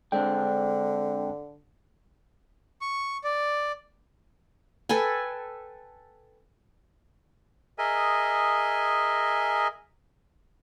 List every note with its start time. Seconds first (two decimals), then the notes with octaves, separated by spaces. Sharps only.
0.12 D3 G#3 C4 D4 G5
2.81 C#6
3.24 D5
4.89 A4 B4 G5 G#5
7.78 G#4 A#4 D#5 E5 G#5